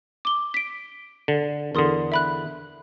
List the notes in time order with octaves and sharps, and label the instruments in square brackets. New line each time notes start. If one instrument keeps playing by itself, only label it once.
[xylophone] D6 G7
B6 D7
[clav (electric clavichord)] D3
[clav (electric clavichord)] E2 D3 [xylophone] A#4 C6 D#6
[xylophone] E5 B5 F#6